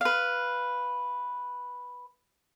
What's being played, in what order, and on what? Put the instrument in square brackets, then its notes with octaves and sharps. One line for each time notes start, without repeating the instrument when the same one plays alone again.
[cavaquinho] B4 F5